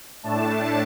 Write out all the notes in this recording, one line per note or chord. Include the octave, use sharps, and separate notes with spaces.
A2 A3 D4 A5